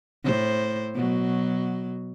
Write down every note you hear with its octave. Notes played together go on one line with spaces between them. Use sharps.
A2 C5
B2 F#3